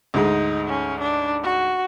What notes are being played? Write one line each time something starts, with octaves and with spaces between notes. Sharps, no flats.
D2 G#2 G#3 D#4
C#4
D4
F#4